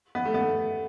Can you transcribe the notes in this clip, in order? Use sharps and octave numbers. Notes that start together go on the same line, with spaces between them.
B3
A3
B3
A3